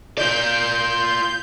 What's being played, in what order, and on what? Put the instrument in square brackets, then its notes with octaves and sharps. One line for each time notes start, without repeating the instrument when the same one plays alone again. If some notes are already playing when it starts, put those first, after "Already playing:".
[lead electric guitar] F4 D5 [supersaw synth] G6